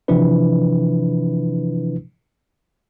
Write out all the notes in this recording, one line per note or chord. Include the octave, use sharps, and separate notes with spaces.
C3 E3 F3 D4 E4 B4